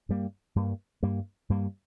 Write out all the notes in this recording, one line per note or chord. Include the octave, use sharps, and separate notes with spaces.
G2 G3 A#3
G2 G3 A#3
G2 G3 A#3
G2 G3 A#3